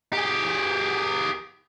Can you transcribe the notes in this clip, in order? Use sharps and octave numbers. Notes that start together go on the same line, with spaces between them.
G4 G#4